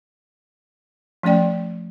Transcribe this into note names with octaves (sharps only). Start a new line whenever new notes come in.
F3 A3 C#4 D5 G5